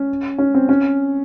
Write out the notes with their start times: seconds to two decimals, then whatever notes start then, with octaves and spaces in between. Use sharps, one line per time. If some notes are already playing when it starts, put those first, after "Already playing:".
Already playing: C#4
0.38 C#4
0.54 C4
0.69 C#4